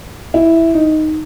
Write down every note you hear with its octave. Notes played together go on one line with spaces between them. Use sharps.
E4
D#4